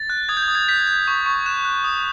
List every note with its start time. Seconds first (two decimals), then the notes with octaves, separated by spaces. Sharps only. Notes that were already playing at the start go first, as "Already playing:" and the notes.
Already playing: A6
0.10 F#6
0.29 D#6 G#6
0.37 G6
0.43 G#6
0.48 D#6
0.55 G#6
0.68 G6 B6
0.87 G6
1.08 C#6
1.26 C#6
1.46 F#6 E7
1.65 F#6
1.84 D#6